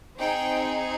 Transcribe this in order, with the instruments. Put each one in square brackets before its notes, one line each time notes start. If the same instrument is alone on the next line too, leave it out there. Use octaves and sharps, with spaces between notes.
[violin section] C4 D#4 G#4 G5